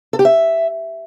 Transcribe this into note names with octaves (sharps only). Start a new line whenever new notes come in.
A4
G4
E5